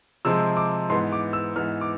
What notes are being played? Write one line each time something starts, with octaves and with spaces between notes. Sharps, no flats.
C3 F3 G#3 C4 E6
D6
G#2 E3 B3 C6
D6
E6
G#2 E3 B3 F6
D6